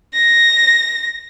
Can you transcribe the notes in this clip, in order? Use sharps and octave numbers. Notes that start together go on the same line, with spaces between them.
A#6